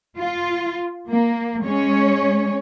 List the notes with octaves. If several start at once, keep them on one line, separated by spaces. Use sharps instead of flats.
F4
A#3
G#3 C#4 C#5